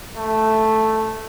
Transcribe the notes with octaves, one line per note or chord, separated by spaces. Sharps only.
A3